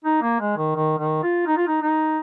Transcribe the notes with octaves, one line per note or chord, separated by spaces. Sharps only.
D#4
A#3
G#3
D#3
D#3
D#3
F4
D#4
F4
D#4
D#4